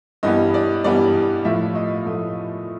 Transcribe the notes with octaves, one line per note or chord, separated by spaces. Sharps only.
G2 E3 G3 B3 D#5
D5
G2 E3 G3 B3 D5
A2 F3 A3 E5
D#5
A2 F3 A3